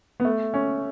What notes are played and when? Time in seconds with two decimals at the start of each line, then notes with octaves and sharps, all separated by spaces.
0.20 B3
0.25 A3
0.54 C#4